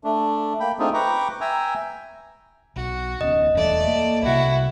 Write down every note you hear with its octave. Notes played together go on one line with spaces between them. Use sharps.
A3 D4
A#3 G5 B5
A3 C4 D4 D#4 F4 G#4
B4 G5 A#5 C#6 D6
E5 G5 G#5 A#5
B1 F#4
D1 B3 C#4 D#5
E1 E2 G3 A3 D5
A#3
C2 C3 E4 F#4